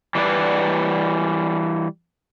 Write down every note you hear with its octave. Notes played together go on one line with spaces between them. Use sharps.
E3 G3 D#4 B4 D5